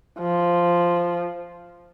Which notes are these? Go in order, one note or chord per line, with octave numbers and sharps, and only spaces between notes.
F3